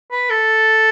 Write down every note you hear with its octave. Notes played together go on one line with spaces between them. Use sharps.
B4
A4